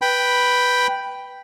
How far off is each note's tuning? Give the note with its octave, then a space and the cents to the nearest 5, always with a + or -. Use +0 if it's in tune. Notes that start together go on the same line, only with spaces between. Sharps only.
B4 +0 G5 +0 B5 +0